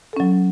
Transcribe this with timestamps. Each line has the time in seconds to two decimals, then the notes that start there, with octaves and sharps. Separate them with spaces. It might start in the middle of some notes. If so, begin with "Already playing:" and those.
0.13 A4
0.17 C#4
0.20 F#3